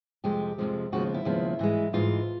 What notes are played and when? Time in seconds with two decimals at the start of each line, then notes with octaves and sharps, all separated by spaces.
0.24 F2 C3 F3 G#3 G4
0.58 F2 C3 F3 G#3
0.92 D#2 C#3 F3 G#3 B3 F#4
1.14 E4
1.25 D#2 C#3 F3 G#3 B3
1.59 G#2 E3 G#3
1.93 G#2 E3 G#3 F4